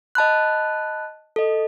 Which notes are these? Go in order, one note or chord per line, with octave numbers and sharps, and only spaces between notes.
D#5 A5 B5 F#6
A4 D#5